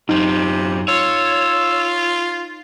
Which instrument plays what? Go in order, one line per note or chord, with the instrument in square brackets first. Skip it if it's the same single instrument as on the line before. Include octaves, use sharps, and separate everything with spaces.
[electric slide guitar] F#2 C4 [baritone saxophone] C3 [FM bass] D#4
[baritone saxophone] F4 [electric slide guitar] C#5 [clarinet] E6